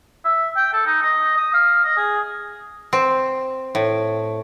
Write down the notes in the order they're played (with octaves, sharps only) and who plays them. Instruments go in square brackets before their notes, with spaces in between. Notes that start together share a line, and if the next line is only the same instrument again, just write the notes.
[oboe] E5
G5
A4
D#4
D#5
D#6
F5
D#5
G#4
[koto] C4
A2